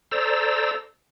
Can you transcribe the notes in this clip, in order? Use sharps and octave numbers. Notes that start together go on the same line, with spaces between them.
A4 C5 D5 A#5 E6